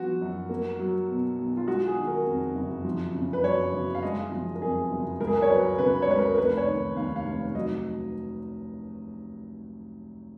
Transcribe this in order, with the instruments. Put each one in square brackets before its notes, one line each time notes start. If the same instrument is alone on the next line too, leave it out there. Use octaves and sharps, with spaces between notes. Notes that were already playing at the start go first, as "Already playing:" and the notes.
Already playing: [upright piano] F3 B3 F#4
F#2
A#3
F#3
B2
B1
F4
G#3 F#4
G#4
D#3
A#4
F2
F#1
F3
C#3
B4
F#2 C#5
F#1
F5
G#3 D#5
F3
A#4
F2 G#4
F#1
C#2 A#4
G#4
A#4
C#5
F#3 B4
C#3 B4
C#5
C#2 B4
A#4
A#4
F1 B4
C#5
D#3
D#2 F5
F5
F1
F#3 D#5